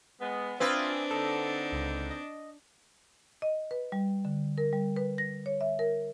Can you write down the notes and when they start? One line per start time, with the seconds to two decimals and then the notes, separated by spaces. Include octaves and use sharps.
0.20 G#3 B3
0.60 C4 D4 F4 B4 E5 G#5 D#6
1.11 D3 D#4 A4
1.72 C#2
2.11 D#5
3.42 D#5
3.71 B4
3.92 G3
4.25 D3
4.58 A#4
4.73 G3
4.96 B4
5.18 A#6
5.46 C#5
5.61 E5
5.79 A#4